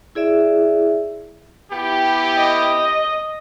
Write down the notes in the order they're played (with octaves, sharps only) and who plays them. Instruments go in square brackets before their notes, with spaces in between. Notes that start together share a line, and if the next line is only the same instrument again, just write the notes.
[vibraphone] E4 G#4 D5 E5
[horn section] B3 E4 G4
[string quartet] D#5